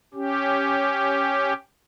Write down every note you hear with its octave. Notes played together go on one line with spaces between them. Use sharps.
C#4 G4